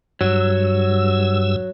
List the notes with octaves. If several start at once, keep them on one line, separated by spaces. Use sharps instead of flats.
G2 F#3 E6